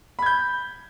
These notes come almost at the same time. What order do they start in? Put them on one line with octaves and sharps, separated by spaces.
B5 G#6 G6